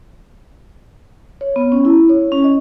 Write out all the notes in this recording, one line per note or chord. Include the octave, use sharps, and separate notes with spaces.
C#5
B3
C#4
E4
C#5
C#4
D#5